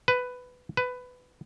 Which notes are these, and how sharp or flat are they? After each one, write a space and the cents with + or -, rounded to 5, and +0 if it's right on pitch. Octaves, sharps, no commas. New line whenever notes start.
B4 +10
B4 +15